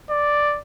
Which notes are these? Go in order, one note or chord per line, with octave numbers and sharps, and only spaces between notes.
D5